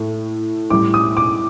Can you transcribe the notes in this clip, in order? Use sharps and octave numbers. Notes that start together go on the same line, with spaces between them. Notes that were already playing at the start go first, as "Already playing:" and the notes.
Already playing: A2 A3
A2 G3 D6
D#6
D6